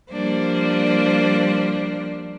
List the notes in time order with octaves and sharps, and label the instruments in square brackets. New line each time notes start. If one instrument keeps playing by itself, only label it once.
[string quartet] F3 G3 A#3 D4 C5